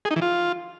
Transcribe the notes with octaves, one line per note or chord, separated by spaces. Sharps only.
G#4
D#4
E3
F4